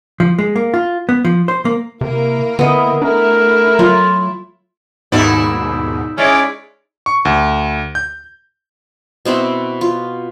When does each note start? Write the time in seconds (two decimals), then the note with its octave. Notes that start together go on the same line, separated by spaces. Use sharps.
0.20 F3
0.38 G#3
0.56 A#3
0.74 F4
1.09 B3
1.25 F3
1.48 C5
1.65 A#3
2.01 C3 A#3 E4 A#4
2.59 D3 B3 E4 D#5
3.02 A3 D4 E4 A#4
3.79 F#3 F4
5.12 D#2 G#2 B2 D#4 E4 D5
6.18 G#3 C#4 E4 D5
7.06 C#6
7.25 D2
7.95 G6
9.25 B2 C4 E4 B5
9.81 F4